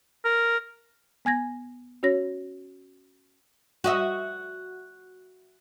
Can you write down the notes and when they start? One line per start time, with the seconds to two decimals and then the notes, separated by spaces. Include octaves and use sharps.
0.25 A#4
1.25 B3 G#5 G#6 A#6
2.03 C#4 F#4 C#5 A#6
3.84 F#4 D#5 E5